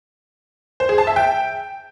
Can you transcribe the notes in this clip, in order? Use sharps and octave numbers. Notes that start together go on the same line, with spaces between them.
C5
G#4
A5
E5
G5